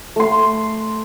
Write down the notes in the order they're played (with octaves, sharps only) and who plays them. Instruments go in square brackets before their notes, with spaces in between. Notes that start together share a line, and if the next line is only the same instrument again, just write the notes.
[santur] A3 C6